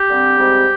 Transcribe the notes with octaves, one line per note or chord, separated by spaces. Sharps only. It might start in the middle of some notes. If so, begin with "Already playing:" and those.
Already playing: G4
D3 G3 C4
G#2 G3 C4